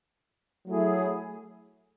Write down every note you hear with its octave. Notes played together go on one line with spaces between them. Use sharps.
F#3 A3 E4 G#4